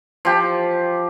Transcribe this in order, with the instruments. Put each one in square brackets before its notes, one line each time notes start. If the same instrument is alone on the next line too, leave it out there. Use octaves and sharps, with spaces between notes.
[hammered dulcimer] F3 G4